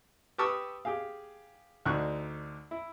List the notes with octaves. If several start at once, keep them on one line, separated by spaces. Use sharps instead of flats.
G4 B4 A5 C#6 D#6 E6
G4 G#4 F5
D2 D3 D#4 C#6 F#6
E4